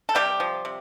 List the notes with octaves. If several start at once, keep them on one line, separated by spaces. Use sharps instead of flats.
A4
C3 G3 G4
F3
C3